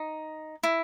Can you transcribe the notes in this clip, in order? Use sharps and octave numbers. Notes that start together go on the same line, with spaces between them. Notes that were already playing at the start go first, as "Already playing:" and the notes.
Already playing: D#4
E4